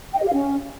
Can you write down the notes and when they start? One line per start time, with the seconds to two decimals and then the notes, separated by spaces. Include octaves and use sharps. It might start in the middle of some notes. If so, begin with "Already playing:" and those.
0.12 G5
0.17 D#5
0.23 G4
0.28 F5
0.34 C#4